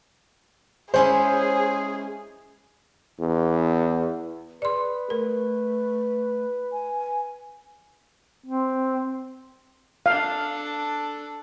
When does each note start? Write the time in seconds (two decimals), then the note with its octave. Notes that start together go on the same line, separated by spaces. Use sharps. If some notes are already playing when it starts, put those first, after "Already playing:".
0.94 G#3 C#4 E4 G#4 C5 G#5
3.20 E2
4.62 G#4 B4 D5 C6
5.10 A3 A#4
6.72 G#5
8.45 C4
10.06 D4 A4 F5